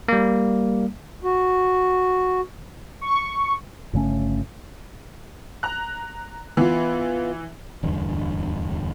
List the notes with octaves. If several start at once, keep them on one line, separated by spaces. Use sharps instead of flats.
G3 A#3
F#4
C#6
G1 C#3 A3 C#4
A#5 F#6
E3 B3 F4
D1 E2 G2 D3